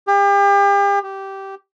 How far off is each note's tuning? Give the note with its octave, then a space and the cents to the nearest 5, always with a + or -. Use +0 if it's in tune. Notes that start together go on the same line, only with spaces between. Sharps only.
G4 +40
G4 -15